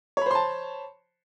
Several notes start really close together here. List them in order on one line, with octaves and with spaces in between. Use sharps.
C#5 B5 C5 C6 A5